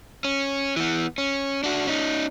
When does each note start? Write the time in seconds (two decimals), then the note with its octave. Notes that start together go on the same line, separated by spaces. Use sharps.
0.24 C#4
0.77 E3 B3
1.18 C#4
1.64 D4 F#4
1.87 C#4 D#4